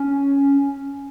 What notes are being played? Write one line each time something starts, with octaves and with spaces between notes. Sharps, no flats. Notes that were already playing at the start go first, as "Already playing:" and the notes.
Already playing: C#4